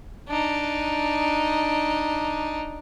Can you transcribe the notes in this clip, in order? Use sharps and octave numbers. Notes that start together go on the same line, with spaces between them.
D4 D#4